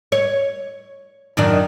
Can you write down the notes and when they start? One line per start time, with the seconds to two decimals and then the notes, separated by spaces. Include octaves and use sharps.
0.12 C#5
1.37 F#2 D#3 D4